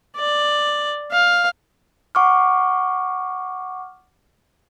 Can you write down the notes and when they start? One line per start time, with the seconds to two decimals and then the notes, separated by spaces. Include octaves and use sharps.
0.16 D5
1.12 F5
2.15 F#5 C#6 D6 F6